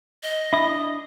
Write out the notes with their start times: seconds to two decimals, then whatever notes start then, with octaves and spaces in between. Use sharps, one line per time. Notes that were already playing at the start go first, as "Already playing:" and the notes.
0.23 D#5
0.53 D4 E4 D#6